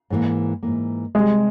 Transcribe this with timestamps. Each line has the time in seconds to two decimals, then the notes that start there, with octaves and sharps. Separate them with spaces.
0.10 G#2 E3 A#3
0.63 G#2 E3 A#3
1.15 C3 G3 G#3 C4